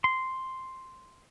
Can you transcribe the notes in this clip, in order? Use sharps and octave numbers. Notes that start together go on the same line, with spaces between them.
C6